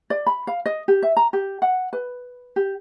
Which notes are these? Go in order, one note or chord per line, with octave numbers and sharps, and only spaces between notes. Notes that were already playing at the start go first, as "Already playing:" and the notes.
D5
B5
F5
D#5
G4
E5
A#5
G4
F#5
B4
G4